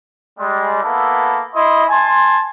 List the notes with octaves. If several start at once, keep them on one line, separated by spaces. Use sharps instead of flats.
G3 G#3
A#3 B3 E4 A4
E4 D#5 C6
G#5 A5 C6